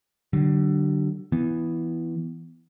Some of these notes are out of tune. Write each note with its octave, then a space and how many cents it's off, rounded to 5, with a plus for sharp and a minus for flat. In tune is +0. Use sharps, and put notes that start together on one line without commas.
D3 +10 F#3 +45
E3 +0 B3 +0